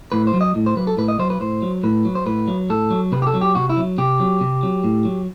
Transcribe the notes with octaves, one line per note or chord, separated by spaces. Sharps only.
A2 B4
C5
F#3
D#5
A2
C5
F#3 B4
A4
A2 B4
D#5
F#3 C5
B4
A2 C5
F#3
A2 B4
F#3
C5
A2 B4
F#3
A2 A4
F#3
C3 B4
G4
A4
F#3
G4
C3 F#4
E4
F#3
C3 G4
F#3
C3
F#3
A2
F#3